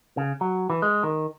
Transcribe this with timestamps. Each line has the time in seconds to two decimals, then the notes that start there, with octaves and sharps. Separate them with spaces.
0.17 C#3
0.41 F#3
0.70 E3
0.82 G#3
1.03 D#3